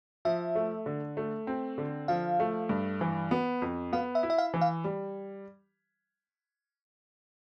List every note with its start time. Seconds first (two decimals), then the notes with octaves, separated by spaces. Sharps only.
0.25 F3 E5
0.55 A3
0.86 D3
1.17 A3
1.47 C4
1.78 D3
2.08 F3 F5
2.40 A3
2.69 G2
3.01 E3
3.31 B3
3.62 F2
3.93 B3 F5
4.15 E5
4.23 E4
4.30 E5
4.38 F5
4.54 E3
4.61 F5
4.84 G3